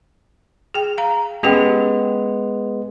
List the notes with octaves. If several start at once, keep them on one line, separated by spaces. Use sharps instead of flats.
G#4 G5
F5 A#5
G#3 B3 C#4 G4 G5